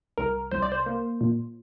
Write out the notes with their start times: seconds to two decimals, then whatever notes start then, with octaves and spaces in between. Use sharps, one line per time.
0.18 C2 A#4
0.52 C2 C5
0.62 D5
0.72 C5
0.86 A#3
1.21 A#2